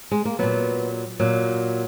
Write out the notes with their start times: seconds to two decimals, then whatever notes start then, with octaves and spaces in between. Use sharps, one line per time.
0.11 G#3
0.25 A#3
0.39 A#2 F#3 B3
1.19 A#2 F#3